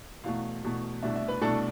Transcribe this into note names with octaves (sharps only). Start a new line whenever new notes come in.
E2 B2 A3 F5
E2 B2 A3
C2 B2 A3 D4 E5
E5
B4
C2 B2 A3 D4 A4